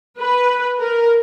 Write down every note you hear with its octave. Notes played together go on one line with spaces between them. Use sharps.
B4
A#4